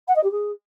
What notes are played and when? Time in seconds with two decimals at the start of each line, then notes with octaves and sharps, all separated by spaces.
0.07 F#5
0.15 D#5
0.23 G4
0.31 G#4